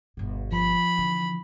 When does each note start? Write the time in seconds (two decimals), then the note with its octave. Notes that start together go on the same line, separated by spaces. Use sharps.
0.17 G1 B2
0.52 F3 B5
0.98 D3 E3